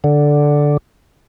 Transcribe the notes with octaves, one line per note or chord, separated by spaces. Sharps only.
D3